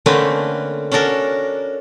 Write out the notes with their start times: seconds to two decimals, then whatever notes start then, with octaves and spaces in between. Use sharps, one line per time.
0.06 D3 A3 A#3 C4 C#4 B4
0.92 C#4 D4 F#4 A4 A#4